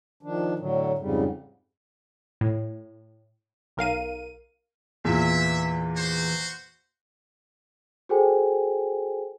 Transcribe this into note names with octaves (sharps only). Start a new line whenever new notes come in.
D#3 F3 D4
A2 D3 F#3
F2 G#2 C#3 G3
A2
B1 A#4 F5 D#7
E2 A#2 E3 E5
F#4 C5
F#4 G#4 A4 C5 G5 G#5